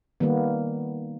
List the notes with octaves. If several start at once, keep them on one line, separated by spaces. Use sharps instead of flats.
D#3 G3 A#3 B3